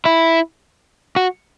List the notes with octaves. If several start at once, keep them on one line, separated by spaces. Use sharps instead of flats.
E4
F#4